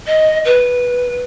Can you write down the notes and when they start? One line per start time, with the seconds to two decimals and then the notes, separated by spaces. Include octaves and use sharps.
0.06 D#5
0.44 B4